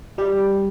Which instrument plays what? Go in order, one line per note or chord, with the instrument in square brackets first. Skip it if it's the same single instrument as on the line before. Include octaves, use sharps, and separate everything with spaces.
[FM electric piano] G3 G4